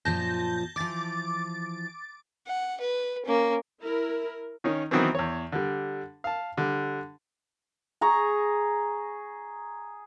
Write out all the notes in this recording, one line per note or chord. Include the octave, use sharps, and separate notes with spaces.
F#2 A#2 F3 A5 G6 A#6
E3 F3 D6 A6
F#5
B4
A#3 C#4
E4 A#4
D#3 C#4 D#4
D#3 E3 F#3 B3 C4
E2 C#5
D3 G3
F5 A5
D3 G3
G#4 A#5 C#6